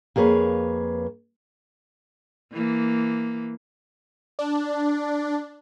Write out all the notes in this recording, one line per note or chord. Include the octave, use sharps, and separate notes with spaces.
F2 A#3 G#4 B4 C#5
E3 A#3
D4